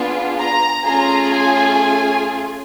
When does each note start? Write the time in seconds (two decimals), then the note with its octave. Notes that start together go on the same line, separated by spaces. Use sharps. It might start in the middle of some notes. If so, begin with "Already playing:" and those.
Already playing: B3 D4 F4 G#4
0.38 A#5
0.85 A3 C#4 F4 G#4 A#5
1.32 G#5